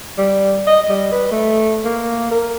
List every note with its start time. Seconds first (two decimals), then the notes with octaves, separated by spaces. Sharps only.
0.18 G3
0.67 D#5
0.89 G3
1.12 B4
1.31 A3
1.85 A#3
2.31 A#4